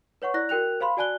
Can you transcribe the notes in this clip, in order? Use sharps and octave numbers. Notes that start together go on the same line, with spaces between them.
B4 C#5 F#5 C#6
E4 D5 F#6 A#6
F#4 A#4 G5 F#6 F7
C5 F5 B5 C6
F#4 D5 G#5 A5 F#6 G7